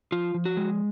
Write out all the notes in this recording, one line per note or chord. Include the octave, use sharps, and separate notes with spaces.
F3 F4
F3
F#4
G#3